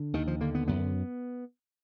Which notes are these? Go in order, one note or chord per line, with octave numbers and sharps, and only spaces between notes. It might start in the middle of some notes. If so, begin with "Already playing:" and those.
Already playing: D3
D#2 D#3
F3
D3 A#3
B3
F#2 B3